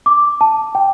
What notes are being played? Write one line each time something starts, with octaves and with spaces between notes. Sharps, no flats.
D6
A5
G5